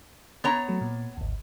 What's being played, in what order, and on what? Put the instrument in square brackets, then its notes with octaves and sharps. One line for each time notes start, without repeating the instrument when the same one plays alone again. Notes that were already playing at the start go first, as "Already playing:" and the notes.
[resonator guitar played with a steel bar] B3 C#5 A#5
[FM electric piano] F#3 A3
A#2
G#1 D2